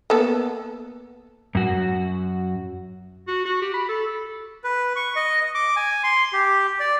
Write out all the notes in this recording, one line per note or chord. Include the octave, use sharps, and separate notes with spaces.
A#3 B3 A4
F#2 F#4
F#4
F#4
G4
B5
A4
B4
C#6
D#5
D6
G#5
C6
G4
D5